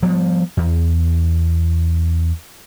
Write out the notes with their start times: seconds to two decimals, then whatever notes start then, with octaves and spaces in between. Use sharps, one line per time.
0.03 F3 G3 B3
0.57 E2